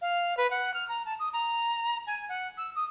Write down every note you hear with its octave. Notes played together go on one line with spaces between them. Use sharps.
F5
B4
F#5
F6
A#5
A5
D#6
A#5
G#5
F#5
E6
D#6